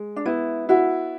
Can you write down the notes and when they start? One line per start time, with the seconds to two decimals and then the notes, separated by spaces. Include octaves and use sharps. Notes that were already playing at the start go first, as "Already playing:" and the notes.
Already playing: G#3
0.16 D4
0.25 B3 E4
0.69 E4 F#4